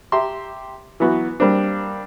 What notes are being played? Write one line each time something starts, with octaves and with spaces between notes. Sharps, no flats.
G4 E5 A#5 C6
E3 F#3 B3 F#4
G3 A#3 C4 D4